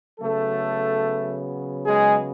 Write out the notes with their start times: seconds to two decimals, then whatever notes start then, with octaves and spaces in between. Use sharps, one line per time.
0.19 C#3 F#3 A3 B3 A4
1.85 G#3 G#4